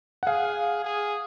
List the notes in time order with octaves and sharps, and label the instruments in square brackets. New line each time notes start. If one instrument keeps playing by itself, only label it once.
[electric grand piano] F#5
[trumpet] G#4 [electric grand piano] F5
[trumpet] G#4